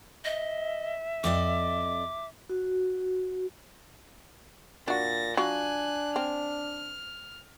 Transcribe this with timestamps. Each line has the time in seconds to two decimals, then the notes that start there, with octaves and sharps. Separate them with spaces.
0.25 D#5 E5
1.24 F2 D5 D#5 D6
2.50 F#4
4.88 A#2 D4 F#4 A6 A#6
5.37 F#3 D4 F4 G#5 F#6
6.16 C4 F6